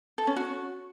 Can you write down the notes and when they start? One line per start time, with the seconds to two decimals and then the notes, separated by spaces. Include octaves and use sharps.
0.18 A4
0.27 C#4
0.36 F#4